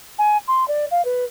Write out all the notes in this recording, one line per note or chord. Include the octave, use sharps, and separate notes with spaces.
G#5
C6
D5
F5
B4